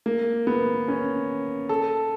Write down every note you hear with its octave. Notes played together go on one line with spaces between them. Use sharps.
A#3
B3
C#4
A4